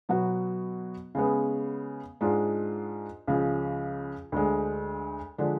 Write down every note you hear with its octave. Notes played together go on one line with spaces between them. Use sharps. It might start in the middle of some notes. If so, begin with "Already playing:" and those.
B2 F#3 B3 F#4
C#3 G#3 B3
G#2 G#3 D4 F4
C#2 C#3 F3
D2 D3 G#3
D3 F3 G#3 D4